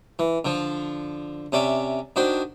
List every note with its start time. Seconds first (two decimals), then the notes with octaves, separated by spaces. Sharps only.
0.19 E3
0.45 D3 F3
1.52 C3 C#4 D5 E5
2.16 D#3 D4 F#4 C5